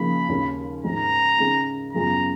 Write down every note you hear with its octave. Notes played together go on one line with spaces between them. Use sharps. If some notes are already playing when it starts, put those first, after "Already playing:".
Already playing: C#3 F3 A#3 D#4 B5
D#2 C#3 G#3 C#4
G#2 D#3 G#3 D#4 A#5
C#3 G#3 D#4
F#2 C#3 G#3 B3 F4 A#5